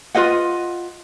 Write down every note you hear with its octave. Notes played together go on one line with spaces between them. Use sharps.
F4 B4 D#5 F#5